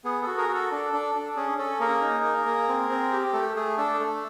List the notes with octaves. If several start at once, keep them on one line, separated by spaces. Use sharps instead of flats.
B3 G#4
F#4 A4
G#4 A#4
F#4
A4
D4
D4
D4
C#4 G#4
C#4 A4
A#3 G#4 A#4
D#4
A#3
A#3
C4
C4
G4
A3 A4
A3 G#4
D4 A4
A3